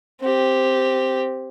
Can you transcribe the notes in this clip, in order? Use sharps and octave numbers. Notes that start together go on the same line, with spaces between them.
C4 G4